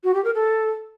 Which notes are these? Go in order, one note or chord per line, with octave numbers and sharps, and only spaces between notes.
F#4
G4
A#4
A4